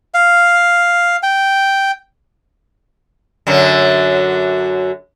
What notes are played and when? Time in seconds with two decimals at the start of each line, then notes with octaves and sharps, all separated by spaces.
0.14 F5
1.23 G5
3.47 F#2 D3 F#3